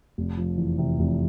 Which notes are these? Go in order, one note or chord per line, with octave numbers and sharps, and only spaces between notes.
F1
F3
E2
C3
F1